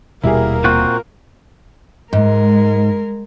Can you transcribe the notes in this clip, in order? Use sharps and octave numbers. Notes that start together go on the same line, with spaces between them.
D#1 B2 G3 A#3 E4 G4 G#4 A#4
A#2 C4 F4 F#4
G#2 G#3 A#4